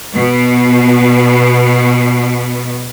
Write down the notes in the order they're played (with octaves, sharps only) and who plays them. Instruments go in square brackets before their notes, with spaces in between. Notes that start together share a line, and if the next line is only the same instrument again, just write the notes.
[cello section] B2 B3